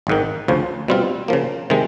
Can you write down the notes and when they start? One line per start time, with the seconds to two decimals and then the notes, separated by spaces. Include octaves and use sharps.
0.07 G#1 G#2 D#3
0.48 D2 C#3 F3
0.88 B2 G3 C4 F4
1.28 C#3 F3 A#3
1.70 C3 D#3 G#3